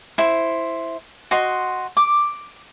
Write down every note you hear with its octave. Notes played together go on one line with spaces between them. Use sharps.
E4 C5
F#4 D#5 C6
D6